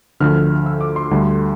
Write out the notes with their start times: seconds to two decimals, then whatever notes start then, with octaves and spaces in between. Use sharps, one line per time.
0.20 D2 D3 F3 A3 F6
0.66 E6
0.81 D6
0.96 C6
1.11 D2 D3 G3